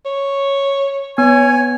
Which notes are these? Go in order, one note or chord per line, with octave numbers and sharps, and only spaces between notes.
C#5
B3 C#5 G#5